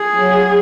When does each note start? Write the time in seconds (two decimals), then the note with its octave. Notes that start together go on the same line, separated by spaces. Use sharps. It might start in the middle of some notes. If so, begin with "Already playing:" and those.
Already playing: G#4
0.17 F#3